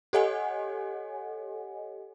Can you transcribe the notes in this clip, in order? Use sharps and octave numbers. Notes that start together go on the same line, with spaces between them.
G4 A4 C#5 D#5 F#5 G#5